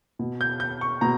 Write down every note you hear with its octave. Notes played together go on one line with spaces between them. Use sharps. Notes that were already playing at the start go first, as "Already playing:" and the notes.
B2
G6
G6
C#6
B2 A#5